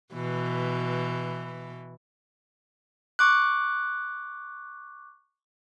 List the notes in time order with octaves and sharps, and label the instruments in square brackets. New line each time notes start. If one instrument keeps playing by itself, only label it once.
[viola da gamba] B2 E3
[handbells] C#6 D6 F#6